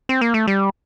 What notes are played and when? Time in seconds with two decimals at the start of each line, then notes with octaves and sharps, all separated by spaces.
0.09 C4
0.21 A#3
0.34 A3
0.47 G3